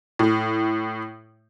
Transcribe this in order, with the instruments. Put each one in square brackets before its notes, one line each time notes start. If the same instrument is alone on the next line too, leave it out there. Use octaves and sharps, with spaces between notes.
[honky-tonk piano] A2